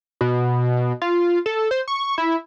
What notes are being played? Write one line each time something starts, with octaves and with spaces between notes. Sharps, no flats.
B2
F4
A4
C5
C#6
E4